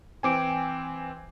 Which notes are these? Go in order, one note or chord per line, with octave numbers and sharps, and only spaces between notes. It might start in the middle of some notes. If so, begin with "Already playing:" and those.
E3 C4 G5 G#5 D6 D7